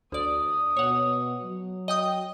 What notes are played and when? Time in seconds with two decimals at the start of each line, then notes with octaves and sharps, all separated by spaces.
0.12 D2 D5 D#6
0.77 B2 C#5 F#5
1.42 F#3
1.88 D#5 G5 D#6